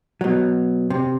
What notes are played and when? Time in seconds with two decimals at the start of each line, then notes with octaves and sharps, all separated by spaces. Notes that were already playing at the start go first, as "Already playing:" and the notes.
0.21 B2 F#3
0.90 C3